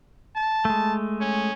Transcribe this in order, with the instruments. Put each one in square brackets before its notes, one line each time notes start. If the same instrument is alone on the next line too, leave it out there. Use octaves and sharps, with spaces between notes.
[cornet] A5
[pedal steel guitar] G#3 A3
[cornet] C#4